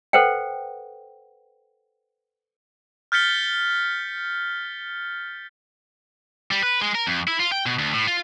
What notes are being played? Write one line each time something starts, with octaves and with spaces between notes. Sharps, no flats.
A4 B4 C5 F#5 G5
F6 G6 A6 B6 C#7 G7
G3
B4
G#3
A#4
F2
E4
F4
G5
B2
D2
A2
F4